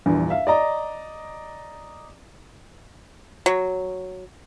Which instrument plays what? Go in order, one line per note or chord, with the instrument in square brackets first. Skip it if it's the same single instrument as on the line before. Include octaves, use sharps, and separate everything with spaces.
[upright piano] A#1 E2 G2
E5 F5
D5 D#5 A#5
[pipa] F#3